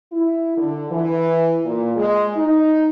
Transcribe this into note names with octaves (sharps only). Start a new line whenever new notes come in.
E4
D3
E3
A#2
G#3
D#4